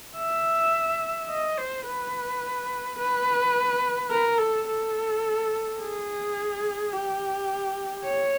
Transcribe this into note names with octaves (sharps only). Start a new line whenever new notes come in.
E5
D#5
C5
B4
B4
A#4
A4
A4
G#4
G4
C#5